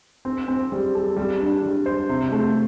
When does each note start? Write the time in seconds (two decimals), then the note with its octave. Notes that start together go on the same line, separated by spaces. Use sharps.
0.25 C4
0.48 C4
0.72 G3
0.95 A4
1.17 G3
1.41 D4
1.62 G3
1.86 C5
2.09 C3
2.32 A3